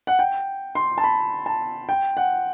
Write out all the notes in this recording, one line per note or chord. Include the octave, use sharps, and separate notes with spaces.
F#5
G5
C6
A5
B5
A5
G5
F#5